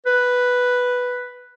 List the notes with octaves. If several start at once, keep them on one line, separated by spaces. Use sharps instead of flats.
B4